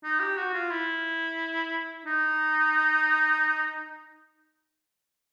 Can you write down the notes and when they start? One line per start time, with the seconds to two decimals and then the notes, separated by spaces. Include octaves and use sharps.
0.04 D#4
0.20 G4
0.38 F#4
0.53 F4
0.71 E4
2.05 D#4